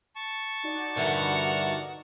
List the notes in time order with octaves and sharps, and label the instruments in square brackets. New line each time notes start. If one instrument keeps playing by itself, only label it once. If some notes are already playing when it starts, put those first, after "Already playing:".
[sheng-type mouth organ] A5 C#6
[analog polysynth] D#4 F#4 D5
[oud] G2 D3 E3 [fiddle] A#4 F#5